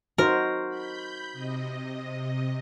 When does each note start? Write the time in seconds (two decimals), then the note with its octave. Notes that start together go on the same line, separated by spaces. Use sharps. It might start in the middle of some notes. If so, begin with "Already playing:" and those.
0.18 D#4 F#4 A#4 C5
0.69 B5 G6
1.33 C3 D#5